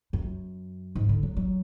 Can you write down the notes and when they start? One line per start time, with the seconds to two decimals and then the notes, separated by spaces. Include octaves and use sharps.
0.13 F#2
0.95 G#2
1.09 D3
1.23 F#3
1.37 F#3